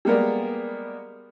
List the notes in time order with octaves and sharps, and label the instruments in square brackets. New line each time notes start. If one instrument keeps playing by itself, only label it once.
[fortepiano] G3 G#3 A#3 B3 A#4 D5